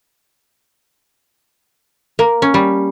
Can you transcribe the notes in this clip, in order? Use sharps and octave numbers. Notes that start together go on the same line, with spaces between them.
A#3
C#4
G3